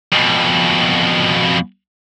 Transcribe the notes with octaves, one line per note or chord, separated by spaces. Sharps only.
F2 B2